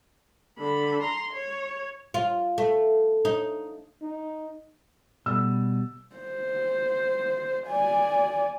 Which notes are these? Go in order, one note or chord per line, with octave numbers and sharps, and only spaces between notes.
D3 B5
A#5 C6
C#5
F4
A3
D#4
D#4
B2 G3 E6
C5
D5 G#5